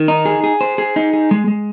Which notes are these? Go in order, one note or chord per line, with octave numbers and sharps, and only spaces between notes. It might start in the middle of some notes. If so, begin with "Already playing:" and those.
Already playing: D#3
D#4
G#4
G#4
C5
G#4
D#4
G#4
G#3
G#3